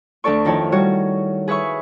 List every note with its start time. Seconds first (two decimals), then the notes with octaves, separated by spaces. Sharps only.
0.24 D2 D4 A4 D5 C#6
0.45 F2 D#3 E4 C#5 A5
0.72 G3 F#4 C#5
1.48 G#4 B4 C#5 E5 C#6